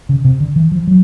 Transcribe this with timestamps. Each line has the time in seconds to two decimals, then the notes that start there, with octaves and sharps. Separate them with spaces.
0.09 C#3
0.25 C3
0.40 D3
0.56 E3
0.72 F3
0.87 F#3